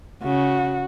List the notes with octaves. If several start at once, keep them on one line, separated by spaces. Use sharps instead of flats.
C#3 F#4